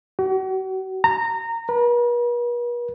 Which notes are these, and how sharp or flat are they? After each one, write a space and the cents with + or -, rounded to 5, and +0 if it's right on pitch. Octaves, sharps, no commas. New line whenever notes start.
F#4 +40
A#5 -20
B4 -45